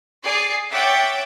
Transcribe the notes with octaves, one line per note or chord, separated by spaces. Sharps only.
G#4 D5 C7
C#5 E5 F#5 G5 D6 A6